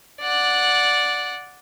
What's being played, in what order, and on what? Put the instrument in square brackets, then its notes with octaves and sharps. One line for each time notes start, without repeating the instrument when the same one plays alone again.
[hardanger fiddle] D5 F#5